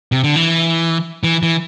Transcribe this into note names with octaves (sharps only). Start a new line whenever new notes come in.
C3
D3
E3
E3
E3